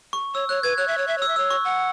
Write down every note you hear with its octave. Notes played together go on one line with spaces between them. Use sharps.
C#6
C#5 E6
C#5 F#6
B4 G#6
C#5 F#6
E5
C#5
E5
C#5 E6
E5
C#5 E6
C#6
F#5